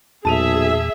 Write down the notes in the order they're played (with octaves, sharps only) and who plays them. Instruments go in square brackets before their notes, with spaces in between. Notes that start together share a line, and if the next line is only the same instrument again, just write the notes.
[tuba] B1 [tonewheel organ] E2 A#2 [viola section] G#4 E5 [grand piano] A5 D#7 F7